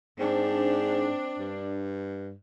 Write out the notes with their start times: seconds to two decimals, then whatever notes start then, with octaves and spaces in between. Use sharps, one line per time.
0.20 G#2 C4 D4
1.39 G2